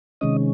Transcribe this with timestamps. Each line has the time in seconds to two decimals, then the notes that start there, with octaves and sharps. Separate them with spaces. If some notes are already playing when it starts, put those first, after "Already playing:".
0.21 C3 D#3 G#3 C#4 D#5